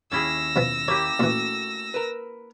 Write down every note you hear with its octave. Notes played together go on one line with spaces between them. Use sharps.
D#2 C#4 E4 G#4 G5 E6 A#6
B2 F3 B3
A#3 E4 G4 C#5
A#2 E3 A3 C#4 F#4
A#4 B4